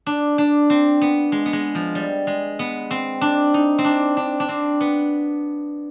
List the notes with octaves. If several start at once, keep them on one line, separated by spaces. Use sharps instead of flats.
D4
D4
C4
B3
G#3
B3
G#3
F3
G3
G#3
B3
C4
D4
D#4
C4
D4
D4
D4
C4
B3